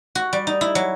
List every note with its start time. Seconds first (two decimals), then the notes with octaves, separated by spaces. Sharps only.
0.15 F#4
0.33 G3
0.47 D#4
0.61 E4
0.75 F#3